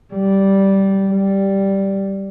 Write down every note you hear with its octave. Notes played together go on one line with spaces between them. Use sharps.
G3
G3